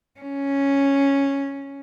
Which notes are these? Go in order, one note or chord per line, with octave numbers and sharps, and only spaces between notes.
C#4